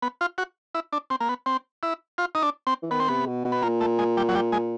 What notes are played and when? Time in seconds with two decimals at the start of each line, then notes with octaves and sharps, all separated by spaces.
0.02 B3
0.21 F4
0.38 F#4
0.75 E4
0.93 D4
1.10 C4
1.20 A#3
1.29 B3
1.46 C4
1.83 E4
2.18 F4
2.35 D#4
2.42 D4
2.67 C4
2.82 E3
2.91 D#3 B3
3.00 C4
3.08 C3 B3
3.27 B2
3.45 B2
3.52 B3
3.62 A#2 A#3
3.81 A3
3.99 G#3
4.17 G3
4.29 F#3
4.35 G3
4.52 G#3